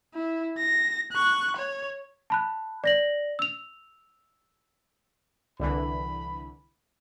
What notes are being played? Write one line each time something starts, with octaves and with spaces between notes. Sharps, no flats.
E4
A#6
C#6 F#6
C#5
A5 B5 F#6
D5 A#6 F#7
E6 F7
C2 D3 E3 B5